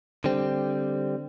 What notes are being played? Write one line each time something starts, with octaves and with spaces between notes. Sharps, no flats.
D3 G3 C4